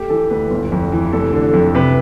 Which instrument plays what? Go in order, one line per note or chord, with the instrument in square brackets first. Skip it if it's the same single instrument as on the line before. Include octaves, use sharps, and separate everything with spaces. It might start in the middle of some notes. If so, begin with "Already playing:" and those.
Already playing: [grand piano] A3 G4
E3 A4
D2 B4
G1
F2
E3
F1 A4
D3
F2
C3 B4